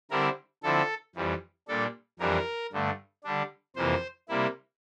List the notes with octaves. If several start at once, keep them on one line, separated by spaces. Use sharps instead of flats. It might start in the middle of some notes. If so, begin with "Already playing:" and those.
D3 G3 C4 E4 A#4
D3 F3 C4 E4 A4
F2 E3 G3
A#2 G3 D4 A4
F2 E3 G3 D4 A#4
G2 D3 A3
D3 G3 D4
F2 C3 E3 A#3 C5
C3 G3 A#3 E4